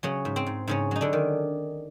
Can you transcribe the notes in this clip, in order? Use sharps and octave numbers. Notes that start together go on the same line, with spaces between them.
C#3 F#3 C#4
G#2
C4
G#2
G#2 C#3 C#4
F#3 D#4
D3 D4
D#3